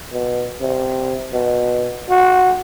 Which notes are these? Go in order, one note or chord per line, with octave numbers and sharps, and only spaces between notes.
B2
C3
B2
F#4